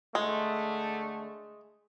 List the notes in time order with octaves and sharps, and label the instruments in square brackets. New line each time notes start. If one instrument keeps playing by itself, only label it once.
[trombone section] D3 A3 [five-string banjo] G#3